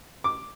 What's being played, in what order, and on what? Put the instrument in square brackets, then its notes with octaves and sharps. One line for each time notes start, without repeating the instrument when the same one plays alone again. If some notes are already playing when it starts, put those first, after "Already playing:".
[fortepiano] D6